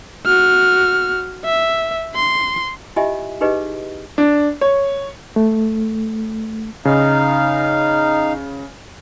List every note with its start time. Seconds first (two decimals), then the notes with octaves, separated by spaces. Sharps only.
0.26 F#4 F6
1.45 E5
2.15 C6
2.96 E4 F4 G4 D#5 E5 G#5
3.41 D#4 E4 G4 G#4 B4 D#5
4.18 D4
4.61 C#5
5.36 A3
6.85 C#3 D#4 F5